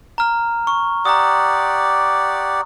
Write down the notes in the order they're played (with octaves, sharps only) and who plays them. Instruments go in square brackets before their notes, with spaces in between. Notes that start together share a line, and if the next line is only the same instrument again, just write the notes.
[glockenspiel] A#5 F6
C#6
[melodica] G4 D5 F#5 [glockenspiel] A#5 D#6